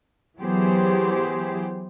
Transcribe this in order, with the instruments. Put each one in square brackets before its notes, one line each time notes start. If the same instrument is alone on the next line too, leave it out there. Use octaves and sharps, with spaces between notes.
[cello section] E3 F#3 B3 G4 G#4 C5